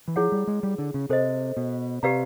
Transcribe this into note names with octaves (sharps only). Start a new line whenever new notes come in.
E3
F3 E4 G#4 C#5 F#5
G3
G#3
G3
D3
C#3
C3 A4 C5 D#5
B2
C3 G4 B4 D5 F5 A#5